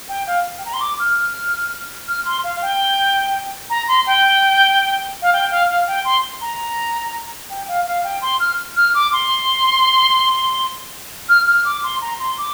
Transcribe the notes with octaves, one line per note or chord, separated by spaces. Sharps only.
G5
F5
G5
A#5
C6
D6
F6
F6
C6
F5
G5
A#5
C6
G5
F5
G5
F5
F5
G5
C6
A#5
G5
F5
F5
G5
C6
F6
F6
D6
C6
F6
F6
D6
C6
A#5
C6
D6